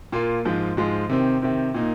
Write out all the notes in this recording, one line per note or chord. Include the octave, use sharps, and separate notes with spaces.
A#2 A#3 F4
G#2 F3 G#3 F4
G#2 F3 G#3 F4
C3 D#3 C4
C3 D#3 C4
A#2 A#3 D#4